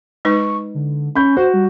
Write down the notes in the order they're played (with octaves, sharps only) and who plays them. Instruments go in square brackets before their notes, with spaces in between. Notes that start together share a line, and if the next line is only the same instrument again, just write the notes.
[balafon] G#3 D#4 B4 [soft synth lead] C#6
[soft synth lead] D3
[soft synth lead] C#4 [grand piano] B5 C#6 G6
[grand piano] F#4 [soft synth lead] C5
[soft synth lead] G3